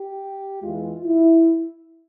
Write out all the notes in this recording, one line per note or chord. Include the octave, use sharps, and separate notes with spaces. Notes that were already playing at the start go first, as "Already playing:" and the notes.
Already playing: G4
E2 E3 G#3 F4
E4